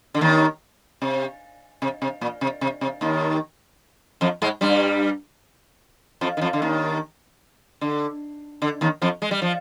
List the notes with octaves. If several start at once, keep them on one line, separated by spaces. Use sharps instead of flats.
D3
D#2 D#3
C3
C3
C3
A#2
C3
C3
C3
D#2 D#3
F2 F3
G#2 G#3
G2 G3
F2 F3
D#3
F2 F3
D3
D#2 D#3
D3
D3
D#2 D#3
F2 F3
G#3
G3
F3